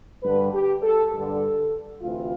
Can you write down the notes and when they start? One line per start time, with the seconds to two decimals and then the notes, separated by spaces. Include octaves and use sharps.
0.23 G2 D3 B4
0.53 G4
0.83 A4
1.12 G2 D3 A4
2.02 D2 C3 E3 F4